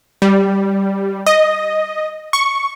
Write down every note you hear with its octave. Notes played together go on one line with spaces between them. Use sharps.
G3
D#5
C#6